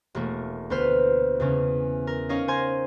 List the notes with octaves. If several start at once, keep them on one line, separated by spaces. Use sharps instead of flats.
E1 A3 A#3
D2 B3 B4 C5 F6
E2 C#3 C#4
A#4
C#4 D#4 C#5 D#5 F5
C5 G#5 A#5 C6 G#6